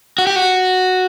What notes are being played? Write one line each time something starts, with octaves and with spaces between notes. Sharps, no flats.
F#4
G4
F#4